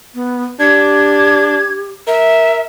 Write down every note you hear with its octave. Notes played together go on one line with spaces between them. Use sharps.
B3
D4 G4 G#6
A#4 E5